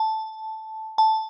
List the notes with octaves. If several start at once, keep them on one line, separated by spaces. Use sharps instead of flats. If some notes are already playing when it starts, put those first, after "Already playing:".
Already playing: A5
A5